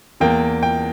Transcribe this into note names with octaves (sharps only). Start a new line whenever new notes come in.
E2 E3 A#3 G5
G5